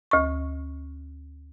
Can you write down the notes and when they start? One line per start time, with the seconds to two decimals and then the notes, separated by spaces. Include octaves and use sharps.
0.11 D2 C#6